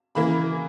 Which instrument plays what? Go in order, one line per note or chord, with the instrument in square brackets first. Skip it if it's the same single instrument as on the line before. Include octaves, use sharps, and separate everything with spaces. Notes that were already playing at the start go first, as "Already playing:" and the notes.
[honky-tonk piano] C#3 E3 A#3 E4 B5